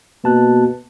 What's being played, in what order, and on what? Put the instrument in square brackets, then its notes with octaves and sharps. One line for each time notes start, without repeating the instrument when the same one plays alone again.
[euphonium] B2 [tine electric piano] A#3 A5 F#6